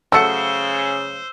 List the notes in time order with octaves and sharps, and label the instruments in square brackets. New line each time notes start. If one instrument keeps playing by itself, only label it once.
[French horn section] C#3 [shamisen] F#3 A3 F#5 [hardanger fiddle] C5 [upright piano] E6 C#7